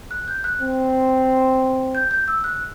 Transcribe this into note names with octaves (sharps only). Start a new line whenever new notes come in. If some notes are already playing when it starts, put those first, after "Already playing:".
F#6
G6
F#6
C4
G6
G6
E6
F#6